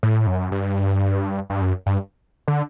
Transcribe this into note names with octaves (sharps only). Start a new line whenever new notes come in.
A2
F#2
G2
G2
F#2
G2
D3